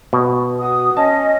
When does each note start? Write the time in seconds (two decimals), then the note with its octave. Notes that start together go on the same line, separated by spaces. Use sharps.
0.13 B2
0.60 F#4 D#6
0.97 C#4 D#5 A5